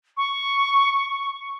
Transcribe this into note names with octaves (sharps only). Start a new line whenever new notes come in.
C#6